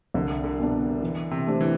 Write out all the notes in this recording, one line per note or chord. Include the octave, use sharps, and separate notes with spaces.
C2 D3
D3
B2 B3 D4
E3
C3
A3 D4 G4 C5
E3